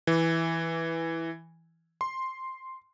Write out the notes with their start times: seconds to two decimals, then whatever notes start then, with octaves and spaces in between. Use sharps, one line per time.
0.07 E3
2.01 C6